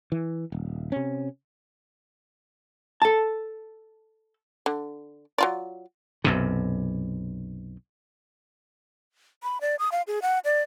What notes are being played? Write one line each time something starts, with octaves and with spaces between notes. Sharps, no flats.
E3
D#1
C3 C#4
A4 A5
D3
F#3 F4 D5
B1 F#2 C3
B5
D5
D#6
F5
G#4
F#5
D5